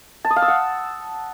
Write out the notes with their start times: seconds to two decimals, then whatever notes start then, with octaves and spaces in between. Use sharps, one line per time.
0.25 A5
0.30 D#6
0.36 F5
0.42 E6
0.48 F#5